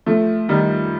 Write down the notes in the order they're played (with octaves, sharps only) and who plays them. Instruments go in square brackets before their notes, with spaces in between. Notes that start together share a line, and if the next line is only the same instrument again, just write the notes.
[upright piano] F3 A3
D#3 G3